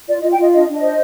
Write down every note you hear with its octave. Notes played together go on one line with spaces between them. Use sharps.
F4 D5
D#5
F4
G5
F4 D#5
D4 D#5
D4
D#5
C5